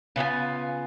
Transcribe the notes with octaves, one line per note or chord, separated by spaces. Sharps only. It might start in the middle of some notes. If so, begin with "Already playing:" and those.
C#3 B3 F4 G#5